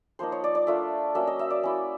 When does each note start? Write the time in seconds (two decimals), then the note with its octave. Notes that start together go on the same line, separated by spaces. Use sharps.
0.19 F3 A#3 D#4 C5
0.32 C#5
0.44 D5
0.55 D5
0.67 A3 D4 F4 E5
1.15 F#3 A#3 C#4 E5
1.27 D#5
1.39 E5
1.50 D5
1.63 A#3 C#4 E4